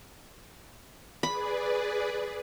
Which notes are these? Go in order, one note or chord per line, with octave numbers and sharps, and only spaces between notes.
G#4 B4 D5 B5